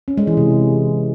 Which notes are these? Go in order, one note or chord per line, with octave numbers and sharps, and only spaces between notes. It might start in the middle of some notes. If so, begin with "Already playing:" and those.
C#4
G#3
E3
C3